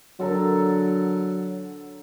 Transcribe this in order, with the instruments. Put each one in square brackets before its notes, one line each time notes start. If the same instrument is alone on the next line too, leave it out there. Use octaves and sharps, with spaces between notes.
[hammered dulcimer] D3 A4 A#4 [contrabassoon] F#3